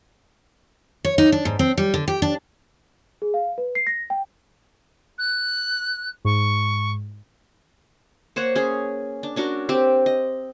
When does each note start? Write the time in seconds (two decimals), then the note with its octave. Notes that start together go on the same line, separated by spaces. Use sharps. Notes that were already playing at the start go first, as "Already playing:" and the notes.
1.05 C#5
1.18 D#4
1.32 D4
1.45 G#2
1.59 C4
1.78 G3
1.94 D3
2.08 G4
2.22 D4
3.22 G#4
3.34 F5
3.58 B4
3.75 C7
3.87 A#6
4.10 G5
5.18 F#6
6.25 G#2 C#6
8.36 A#3 C5 C#5 F#5
8.55 C#4 G#4
9.23 D4
9.36 C#4 D4 F#4 A#4
9.69 C4 G4
10.06 D#5